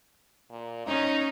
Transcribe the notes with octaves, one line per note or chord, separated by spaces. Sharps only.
A#2
C#4 D#4